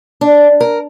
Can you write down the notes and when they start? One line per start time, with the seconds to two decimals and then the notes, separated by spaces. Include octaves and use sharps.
0.21 D4
0.60 A#4